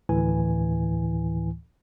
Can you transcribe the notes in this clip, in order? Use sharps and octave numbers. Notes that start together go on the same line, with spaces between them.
D2 A2 E3 G#5